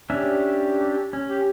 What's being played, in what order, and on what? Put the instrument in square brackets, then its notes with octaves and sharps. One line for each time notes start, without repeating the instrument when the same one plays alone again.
[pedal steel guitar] C#4 D4 E5 [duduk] G4
[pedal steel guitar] C#4
[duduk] G4